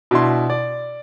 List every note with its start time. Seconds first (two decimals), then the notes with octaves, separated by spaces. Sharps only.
0.11 B2 D4 E4 C6
0.50 D5